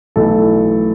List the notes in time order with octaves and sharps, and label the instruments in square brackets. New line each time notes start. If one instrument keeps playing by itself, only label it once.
[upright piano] B1 A2 E3 A4